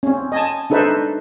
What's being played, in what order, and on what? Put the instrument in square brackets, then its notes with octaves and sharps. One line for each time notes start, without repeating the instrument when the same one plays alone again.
[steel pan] C4 C#4
D#5 G#5 A5
D4 D#4 A4 B4 C5 E5